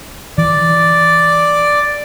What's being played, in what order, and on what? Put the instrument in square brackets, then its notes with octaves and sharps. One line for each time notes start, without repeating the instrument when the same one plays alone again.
[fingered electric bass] E3 [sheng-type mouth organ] D5